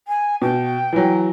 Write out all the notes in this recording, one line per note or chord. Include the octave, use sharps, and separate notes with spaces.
G#5
B2 G5
E3 F#3